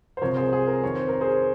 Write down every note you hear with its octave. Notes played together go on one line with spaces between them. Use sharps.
C5
C2 C3 F3 A#4 C#5
G#4 C5
G#4
A#4
F2 D#3 C#5
C5
A#4
G#4 C5